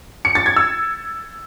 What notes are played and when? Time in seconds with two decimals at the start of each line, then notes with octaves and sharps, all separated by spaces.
0.25 C#7
0.35 A6
0.46 G#6
0.56 E6